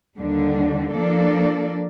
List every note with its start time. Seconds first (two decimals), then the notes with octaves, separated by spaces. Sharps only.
0.17 D#2 D3 G3 D4
0.93 F3 A#3 D4 A4 D5